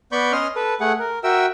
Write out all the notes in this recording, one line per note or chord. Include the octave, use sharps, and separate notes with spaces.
B3 D5 B5 C#6 G6
C#4 D#5 C6 F6
A4 B4
A3 G#4 F#5
A#4
F#4 A#4 E5 G5 E6